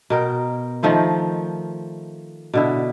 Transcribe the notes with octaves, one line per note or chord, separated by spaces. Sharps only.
B2 A#4 G5
D#3 F3 A3 C5
B2 D3 E4